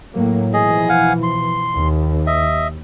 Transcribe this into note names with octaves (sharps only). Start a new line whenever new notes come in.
A2 F#3 A#3
B2 E3 F3 G#4 D#5
F5 F#5 G#5
C6
D#2
D#5 E5